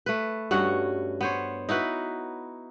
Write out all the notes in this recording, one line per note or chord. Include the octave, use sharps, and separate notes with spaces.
A3 B4
G2 C#4 F#4 F#5
B3 C5 C#5
D#4 E4 F#4 B4